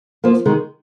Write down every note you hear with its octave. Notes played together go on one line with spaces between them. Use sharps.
F3 A#3
D#3 G#3